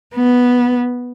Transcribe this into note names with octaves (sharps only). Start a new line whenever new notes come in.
B3